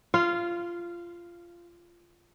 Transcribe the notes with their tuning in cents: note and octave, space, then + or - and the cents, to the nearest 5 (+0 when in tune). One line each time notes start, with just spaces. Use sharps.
F4 -15 F5 +0